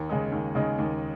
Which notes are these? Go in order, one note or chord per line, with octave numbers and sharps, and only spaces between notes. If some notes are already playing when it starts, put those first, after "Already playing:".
Already playing: D#2
C#3 G#3 D#4
D#2
C#3 G#3 D#4
D#2